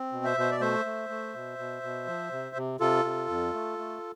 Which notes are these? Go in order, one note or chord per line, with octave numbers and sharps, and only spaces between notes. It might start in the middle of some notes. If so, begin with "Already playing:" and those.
Already playing: C4
B2
C5 E5
B2 C5
D5
A3 C5 E5
A3
A3
B2
B2
B2
F3
C3
C3
C3 F4 A4
C3
F2
A3
A3